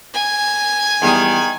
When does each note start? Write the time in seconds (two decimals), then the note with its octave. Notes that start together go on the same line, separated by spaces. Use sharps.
0.14 G#5
1.02 E2 D#3 G3 D#6